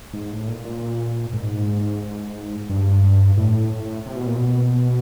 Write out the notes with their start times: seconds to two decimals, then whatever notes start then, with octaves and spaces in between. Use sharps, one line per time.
0.13 G#2
0.30 A2
0.48 A#2
0.65 A#2
1.33 G#2
2.69 G2
3.38 A2
4.06 C3
4.16 B2
4.27 A#2
4.37 B2